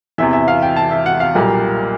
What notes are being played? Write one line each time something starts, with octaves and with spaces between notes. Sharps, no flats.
E2 C3 E3 E5
E5
F5
G5
A5
E5
F#5
F5
B1 A#2 G3 A#3